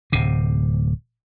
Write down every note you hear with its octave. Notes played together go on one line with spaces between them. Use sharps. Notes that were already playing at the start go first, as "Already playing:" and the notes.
D1 C3